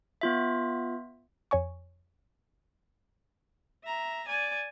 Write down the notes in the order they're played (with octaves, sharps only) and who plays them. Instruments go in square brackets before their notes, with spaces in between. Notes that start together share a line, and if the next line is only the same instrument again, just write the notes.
[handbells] B3 F4 E5
[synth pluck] F2 C#5 G#5 C#6
[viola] E5 A#5
D5 G#5